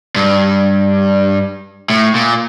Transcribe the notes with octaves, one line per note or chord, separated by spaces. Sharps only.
G2
A2
A#2